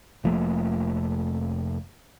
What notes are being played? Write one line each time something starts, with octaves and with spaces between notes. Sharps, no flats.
F1 F3 A3 A#3